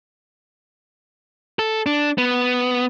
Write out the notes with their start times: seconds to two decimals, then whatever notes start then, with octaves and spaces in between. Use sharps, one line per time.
1.59 A4
1.86 D4
2.18 B3